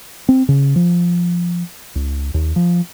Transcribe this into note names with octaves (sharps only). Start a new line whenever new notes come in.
C4
C#3
F3
C#2
D#2
F3